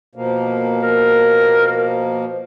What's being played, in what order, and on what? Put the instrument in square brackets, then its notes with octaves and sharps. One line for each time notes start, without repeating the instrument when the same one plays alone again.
[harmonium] B2 F3 A#3
[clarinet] A#4